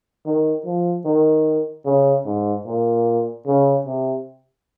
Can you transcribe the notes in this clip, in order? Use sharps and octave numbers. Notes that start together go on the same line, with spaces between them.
D#3
F3
D#3
C#3
G#2
A#2
C#3
C3